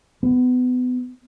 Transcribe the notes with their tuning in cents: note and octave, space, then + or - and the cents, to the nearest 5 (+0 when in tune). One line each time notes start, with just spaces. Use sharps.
B3 +25